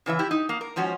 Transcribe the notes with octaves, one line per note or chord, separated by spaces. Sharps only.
C#3 E3 D#5 E5
E4 G4
D#4
A#3
A#4
G#2 F3 C#4 F#4